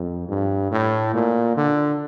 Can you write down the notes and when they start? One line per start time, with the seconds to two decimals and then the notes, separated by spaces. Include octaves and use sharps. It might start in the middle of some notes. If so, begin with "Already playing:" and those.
Already playing: F2
0.29 G2
0.72 A2
1.14 A#2
1.57 D3